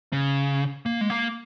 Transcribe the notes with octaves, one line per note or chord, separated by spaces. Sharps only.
C#3
A#3
G#3
A#3